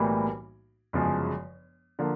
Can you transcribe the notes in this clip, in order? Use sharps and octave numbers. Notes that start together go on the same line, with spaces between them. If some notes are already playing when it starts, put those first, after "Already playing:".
Already playing: B1 A2 E3 G3 A#3
G1 F#2 C#3 F3 G#3
D3 F3 A#3